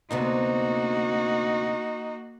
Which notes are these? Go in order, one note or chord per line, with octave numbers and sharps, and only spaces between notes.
D2 C3 A#3 B3 D#4 F#4